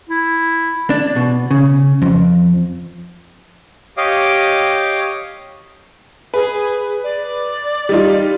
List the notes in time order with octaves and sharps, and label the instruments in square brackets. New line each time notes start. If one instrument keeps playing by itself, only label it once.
[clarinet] E4
[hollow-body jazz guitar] D4
B2
C#3
F2
[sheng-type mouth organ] G4 C#5 D#5 F5 D6 D#6
[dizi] G#4 [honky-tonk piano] B4
[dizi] D5
[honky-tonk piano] G3 D#4 F4